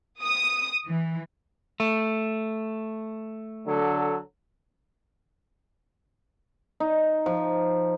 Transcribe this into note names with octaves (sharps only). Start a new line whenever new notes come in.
D#6
E3
A3
D3 F#3 A4
D#4
F3